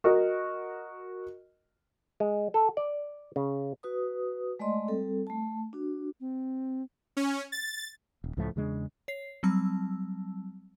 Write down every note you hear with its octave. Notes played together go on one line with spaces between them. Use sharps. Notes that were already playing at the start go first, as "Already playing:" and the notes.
F#4 A#4 D#5
G#3
A4
D5
C#3
F#4 B4 D#6
G#3 A3 D5 D#5 C6
G3 C4 A4
A3 A5
D4 F#4
C4
C#4
A6
D#1
C#2 A2 F3 A3
E2 C#3 G#3 D4
C#5 C7
F#3 G3 C4 A5 E6